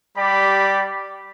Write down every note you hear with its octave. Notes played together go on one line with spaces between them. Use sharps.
G3 G4 D5 B5